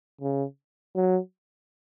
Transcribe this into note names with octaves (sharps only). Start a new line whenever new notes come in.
C#3
F#3